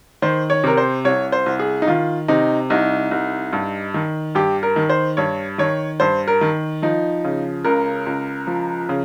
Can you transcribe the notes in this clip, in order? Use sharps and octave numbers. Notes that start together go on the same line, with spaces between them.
D#3 C5
C#5
C3 A#4
C5
C2 C#5
C5
C2
G#4
D#4
D#3 F4
C3 D#4
C2 D#4
C2
G2
D#3
G2 G4
A#4
D#3
C5
G2 C#5
D#3 C#5
G2 C5
A#4
D#3
F3 D#4
C#3
C#2 A#4
C#2
F3
C#3